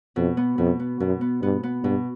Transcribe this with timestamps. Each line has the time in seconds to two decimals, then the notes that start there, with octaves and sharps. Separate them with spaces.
0.16 F2 B2
0.37 B3
0.58 F2 B2
0.80 B3
1.00 F#2 B2
1.21 B3
1.42 G2 B3
1.63 B3
1.83 G2 B2